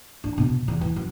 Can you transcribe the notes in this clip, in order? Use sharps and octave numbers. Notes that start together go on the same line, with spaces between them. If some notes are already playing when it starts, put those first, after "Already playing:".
D4
B2
E2
E3
F#2